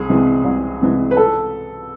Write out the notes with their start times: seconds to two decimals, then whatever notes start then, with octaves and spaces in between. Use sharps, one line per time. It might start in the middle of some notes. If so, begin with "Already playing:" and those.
Already playing: C2 G#4
0.09 C3 E3 G#3
0.44 C2
0.81 C3 E3 G#3
1.11 B4
1.17 A4